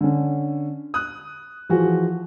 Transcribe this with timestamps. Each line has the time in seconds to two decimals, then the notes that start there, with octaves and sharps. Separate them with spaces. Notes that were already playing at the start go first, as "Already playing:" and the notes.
0.01 D3 C#4
0.94 D#6 F#6
1.69 E3 F3 F4 F#4 G#4